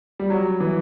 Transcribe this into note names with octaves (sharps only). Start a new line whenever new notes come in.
G3
F#3
E3